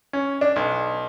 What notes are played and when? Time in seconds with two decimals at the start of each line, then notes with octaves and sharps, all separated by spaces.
0.13 C#4
0.41 D4
0.56 B1